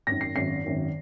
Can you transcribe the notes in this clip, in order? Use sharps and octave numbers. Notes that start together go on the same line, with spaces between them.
G#1 F#2 D#3 A#6
C7
G#1 F#2 D#3 C7
G#1 F#2 D#3